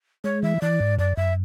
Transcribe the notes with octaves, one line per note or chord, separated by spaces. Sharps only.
G#3 C#5
E3 E5
E3 D5
G#2
F#2 D5
F#2 E5